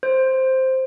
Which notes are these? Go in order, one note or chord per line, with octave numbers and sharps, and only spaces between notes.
C5